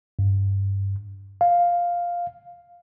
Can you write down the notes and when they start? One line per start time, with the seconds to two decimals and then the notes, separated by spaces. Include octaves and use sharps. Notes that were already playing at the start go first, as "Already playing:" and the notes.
0.19 G2
1.41 F5